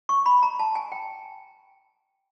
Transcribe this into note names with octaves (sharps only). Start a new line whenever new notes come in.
C#6
B5
A#5
A5
G#5
G5